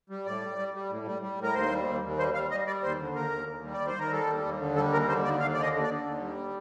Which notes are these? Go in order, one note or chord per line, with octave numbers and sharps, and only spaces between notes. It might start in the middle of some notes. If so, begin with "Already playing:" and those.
G3
A2 D5
G3
G3
G3
A2
G3
G3
A2 A#4
D#2 C5
G3
D#2
D#2
G3 C5
G3 F5
G3 D#5
G3 D5
D#2 C5
D3
D#2 A#4
D#2
D#2
G3
D5
D#2
C5
D#2 A#4
G3 A4
D#2
D#2
D3
G3 A4
D#2 A#4
D3 C5
D#2 D5
D#2 F5
D3 D5
D#5
D3
D5
D3
D#2
G3